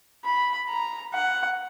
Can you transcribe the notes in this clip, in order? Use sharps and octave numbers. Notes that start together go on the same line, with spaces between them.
B5
A#5
F#5